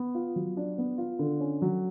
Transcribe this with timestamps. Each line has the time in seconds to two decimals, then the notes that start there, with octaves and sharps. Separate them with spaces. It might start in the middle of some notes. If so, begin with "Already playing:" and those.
Already playing: B3
0.15 F4
0.36 F#3
0.57 D4
0.78 B3
0.98 F4
1.19 D3
1.40 C#4
1.62 F#3